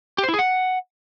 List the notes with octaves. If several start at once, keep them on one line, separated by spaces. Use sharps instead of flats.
G4
C5
E4
G#4
F#5